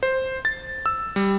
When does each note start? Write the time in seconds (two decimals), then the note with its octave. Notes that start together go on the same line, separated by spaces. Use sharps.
0.03 C5
0.45 A6
0.86 E6
1.16 G3